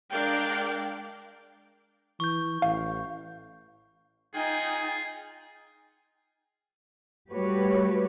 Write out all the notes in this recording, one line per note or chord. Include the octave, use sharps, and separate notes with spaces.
G#3 D4 A#4 D5 F5 G5
E3 C#6 G6
A1 F5
D#4 F4 G#4 G5 G#5
G3 A3 F#4 G4 B4 C#5